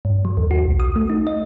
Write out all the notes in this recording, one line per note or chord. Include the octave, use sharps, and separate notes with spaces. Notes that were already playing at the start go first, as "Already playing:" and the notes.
G2
F#3
D#2
F#4
B1
D#6
A3
D#4
D#5